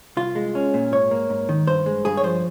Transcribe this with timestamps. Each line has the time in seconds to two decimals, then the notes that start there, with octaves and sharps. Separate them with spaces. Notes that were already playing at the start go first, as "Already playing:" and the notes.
0.17 C2 F4
0.35 G#3
0.55 C#4
0.74 A#2
0.92 G#2 C#5
1.11 A#3
1.30 G#2
1.49 D#3
1.67 G2 C5
1.86 G#3
2.05 G2 G#4
2.17 C#5
2.24 F3 C5